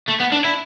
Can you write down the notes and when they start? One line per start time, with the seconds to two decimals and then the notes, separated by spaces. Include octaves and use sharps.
0.08 A3
0.20 B3
0.32 D4
0.45 E4